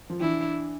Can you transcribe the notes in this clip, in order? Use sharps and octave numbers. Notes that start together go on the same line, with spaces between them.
F3
E3 D4 E4